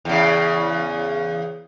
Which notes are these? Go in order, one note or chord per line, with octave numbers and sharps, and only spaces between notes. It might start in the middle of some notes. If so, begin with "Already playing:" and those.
E2 C#3